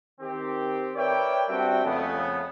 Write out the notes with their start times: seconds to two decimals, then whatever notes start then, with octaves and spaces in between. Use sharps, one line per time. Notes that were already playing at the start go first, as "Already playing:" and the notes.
0.21 D#3 C4 G4
0.96 A#4 B4 C#5 D5 E5 G5
1.49 G3 C4 D4 F#4 E5 G5
1.85 F2 C#3 A3 B3